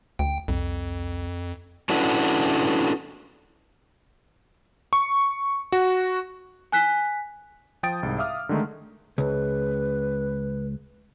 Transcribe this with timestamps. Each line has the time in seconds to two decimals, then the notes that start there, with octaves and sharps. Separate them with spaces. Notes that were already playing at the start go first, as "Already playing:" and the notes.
0.19 D2 G5
0.48 C2 F2
1.89 C#4 D4 E4 F#4 A4 B4
4.93 C#6
5.72 F#4
6.72 G#5 F#6 B6
7.83 F3 G5 D#6 A6 D7
8.03 C2 G#2
8.18 E5 F5 D6 D#6 F6
8.49 D3 D#3 G#3 A3 D#4
9.18 C#2 B4